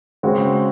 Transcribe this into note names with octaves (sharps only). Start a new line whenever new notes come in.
C#3 G#3 C4 F#4